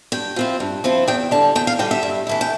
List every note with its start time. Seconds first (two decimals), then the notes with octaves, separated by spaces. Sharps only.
0.12 G2 G5
0.36 F3 C4 E4
0.60 G2
0.84 F3 C4 E4
1.08 E2 G5
1.31 D3 G3 A5
1.55 E2 G5
1.67 F5
1.79 D3 G3 G5
1.91 E5
2.03 G2
2.27 E3 A3 E4
2.41 G5